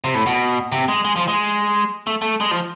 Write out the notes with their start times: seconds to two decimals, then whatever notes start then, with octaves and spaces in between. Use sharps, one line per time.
0.04 C3
0.15 A2
0.26 B2
0.72 C3
0.88 G#3
1.05 G#3
1.16 F3
1.28 G#3
2.07 A3
2.22 A3
2.40 G#3
2.51 F3